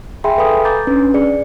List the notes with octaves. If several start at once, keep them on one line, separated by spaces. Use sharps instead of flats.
G#4 E5 G5 G#5 B5 C6
A4 B4 F5 G#5 B5 D#6
A#5 D6 G6 A6
C#4 D4 B4
G#4 D5 C#7